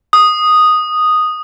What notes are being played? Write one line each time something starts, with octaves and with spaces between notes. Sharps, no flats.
D#6